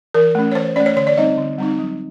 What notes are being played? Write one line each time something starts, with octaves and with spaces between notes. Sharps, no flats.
E3 A#4
A3 C#4
C#5
E3 C5
A3 C#4 D5
C#5
D3 C#5
D5
G3 C4 D#4 D#5
D3
G3 C4 D#4
F#3